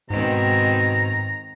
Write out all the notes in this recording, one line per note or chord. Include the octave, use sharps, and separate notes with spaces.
G#2 B2 D#3 G#3 C4 A#5